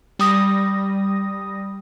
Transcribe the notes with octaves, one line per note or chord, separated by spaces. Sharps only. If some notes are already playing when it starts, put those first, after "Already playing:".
G3 D#6 A#6